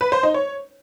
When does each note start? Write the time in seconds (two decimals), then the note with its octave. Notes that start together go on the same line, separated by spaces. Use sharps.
0.01 B4
0.12 C5
0.23 D#4
0.34 C#5